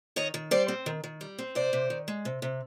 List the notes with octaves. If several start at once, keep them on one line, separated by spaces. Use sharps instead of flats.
D#3 C#5 D#5
D#3
G3 C5 D5
C4
D#3
D#3
G3
C4
C3 C5 D5
C3
D#3
G#3
C3
C3